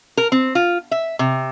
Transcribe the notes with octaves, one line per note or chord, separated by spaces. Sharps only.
A#4
C4
F4
E5
C3